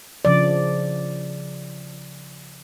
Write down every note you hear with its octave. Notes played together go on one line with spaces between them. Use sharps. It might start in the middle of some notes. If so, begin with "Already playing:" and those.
C#3 F3 D5